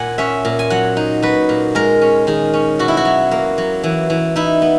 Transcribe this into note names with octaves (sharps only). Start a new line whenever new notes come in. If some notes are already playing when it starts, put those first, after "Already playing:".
Already playing: A#2 F#5 G#5
C#4 E5
A#2
G#5
F#3 F#5
D#4
F#3 B4
A#2
G#3 A#4
C#4
D#3 G#4
C#4
B2 F#4
E4
F#4
F#3
A#3
F#3
E3
E3
D#4 E4
B3